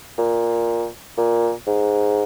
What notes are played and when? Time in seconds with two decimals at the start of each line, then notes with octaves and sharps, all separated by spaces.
0.18 A#2
1.18 A#2
1.67 G#2